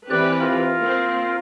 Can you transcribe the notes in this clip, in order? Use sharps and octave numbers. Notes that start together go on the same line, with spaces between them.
E3 C4 G4 B4 D5 F#6
F4 A#4
A#3 C4